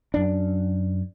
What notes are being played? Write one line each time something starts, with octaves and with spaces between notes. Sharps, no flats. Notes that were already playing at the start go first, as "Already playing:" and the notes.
F#2 D4